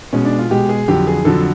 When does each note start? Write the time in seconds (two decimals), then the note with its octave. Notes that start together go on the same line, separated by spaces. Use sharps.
0.13 B2 G#3 C#4
0.25 D4
0.39 F4
0.50 B2 G#3 G4
0.69 G#4
0.88 F2 D3 F#3 G4
1.07 G#4
1.25 F2 D3 F#3 A4